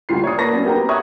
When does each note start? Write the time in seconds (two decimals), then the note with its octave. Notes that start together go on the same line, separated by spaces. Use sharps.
0.09 F#1 D2 G3 F4 C7
0.24 C#5 D5 D#6
0.38 A#3 B4 D5 A5 C#6 A#6
0.53 F#3 B3 C#4 D4
0.64 B3 F#4 G4 A#4 A#5
0.89 C#5 E5 C#6 D#6 F#6 G#6